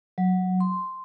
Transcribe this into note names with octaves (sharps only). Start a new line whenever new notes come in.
F#3
C6